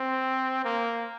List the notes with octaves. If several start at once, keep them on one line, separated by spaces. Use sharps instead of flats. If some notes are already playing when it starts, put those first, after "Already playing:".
Already playing: C4
A#3